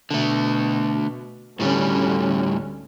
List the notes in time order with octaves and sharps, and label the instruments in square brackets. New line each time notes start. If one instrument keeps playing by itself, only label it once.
[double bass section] B2 [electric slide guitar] D3 A3
[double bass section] D2 D3 C#4 [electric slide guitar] A2 G3